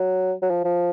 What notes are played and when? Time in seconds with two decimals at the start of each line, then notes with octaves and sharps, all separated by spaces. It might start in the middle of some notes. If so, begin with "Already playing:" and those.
Already playing: F#3
0.42 F#3
0.50 F3
0.64 F3